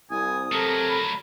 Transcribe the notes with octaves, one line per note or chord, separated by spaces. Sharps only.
C2 G#5 D#6
C3 F#3 A3 A4 A#4
B5